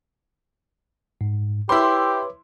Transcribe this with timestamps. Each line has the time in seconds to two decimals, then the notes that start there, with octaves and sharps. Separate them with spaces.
1.21 G#2
1.69 E4 G4 B4 C#5 C6 D6